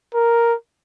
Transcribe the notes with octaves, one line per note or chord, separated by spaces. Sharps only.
A#4